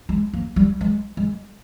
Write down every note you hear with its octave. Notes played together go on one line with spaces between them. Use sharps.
G#3
A#3
G3
G#3
G#3